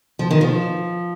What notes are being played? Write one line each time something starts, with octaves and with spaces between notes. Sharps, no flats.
F3
D#3
F3